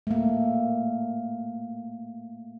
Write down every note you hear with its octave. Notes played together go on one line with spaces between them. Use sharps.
A3 A#3